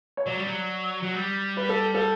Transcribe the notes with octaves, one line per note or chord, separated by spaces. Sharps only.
C#5
F#3 D5
G3
F#3
F#3
G3
B4
A4
A4